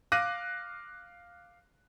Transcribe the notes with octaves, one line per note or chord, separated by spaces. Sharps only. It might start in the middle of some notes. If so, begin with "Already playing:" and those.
F5 D6 F#6 A#6 D#7